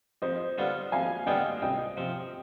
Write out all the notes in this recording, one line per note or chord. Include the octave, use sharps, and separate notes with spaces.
F2 C5 D#5
D3 G3 B3 F4
F2 F5 G#5
D3 G3 B3 F4 D#5 G5
C2 D#5 G5
C3 F3